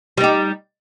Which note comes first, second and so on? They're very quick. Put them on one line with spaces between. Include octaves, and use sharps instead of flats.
G3 D#4 G4